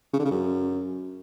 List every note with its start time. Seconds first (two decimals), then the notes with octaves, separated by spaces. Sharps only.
0.13 C#3
0.19 D3
0.25 C#3
0.31 F#2